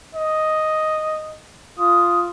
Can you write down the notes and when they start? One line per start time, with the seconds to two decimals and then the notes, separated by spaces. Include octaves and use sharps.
0.14 D#5
1.79 F4 D#6